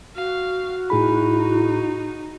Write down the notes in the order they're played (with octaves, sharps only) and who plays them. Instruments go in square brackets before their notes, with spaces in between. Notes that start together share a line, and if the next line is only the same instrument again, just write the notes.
[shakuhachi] F#4 [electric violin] F5
[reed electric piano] A2 G#4 B5 [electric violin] D#4 [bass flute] E4